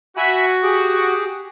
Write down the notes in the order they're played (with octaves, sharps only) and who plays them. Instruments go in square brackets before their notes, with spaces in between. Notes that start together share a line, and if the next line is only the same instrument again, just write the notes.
[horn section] F#4 [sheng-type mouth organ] E5 G#5 B5
[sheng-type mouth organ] G4 G#4